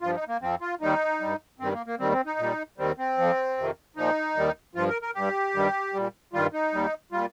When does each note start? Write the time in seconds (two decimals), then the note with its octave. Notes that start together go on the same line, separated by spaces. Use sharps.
0.02 G2 F3 F4
0.15 D#4
0.28 A#3
0.42 F2 F3 C4
0.61 F4
0.81 D#2 D#3 G3 D#4
1.20 G2 G3
1.59 G2 D#3 G3 C4
1.73 A#3
1.86 A#3
1.99 D#2 D#3 G3 C4
2.12 C4
2.26 D#4
2.39 A#2 G3
2.78 D#2 D#3 G3 C4
2.98 C4
3.18 F2 F3
3.57 F2 C3 D#3
3.96 A#2 F3 D#4
4.36 D#2 D#3 G3
4.75 G2 F3 F4
4.89 A#4
5.02 A#4
5.15 G2 G3 G4
5.54 G2 D#3 G3
5.94 A#2 G3
6.33 G2 D#3 G3 F4
6.53 D#4
6.72 D#2 D#3 G3
7.12 A#2 G3 F4